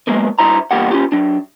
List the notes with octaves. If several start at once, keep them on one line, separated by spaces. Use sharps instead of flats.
F#3 G#3 A#3 B3
G2 E4 C5 A#5
E2 G2 A#3 G4 F#5
C#4 D4 F4 G4
F#3 D4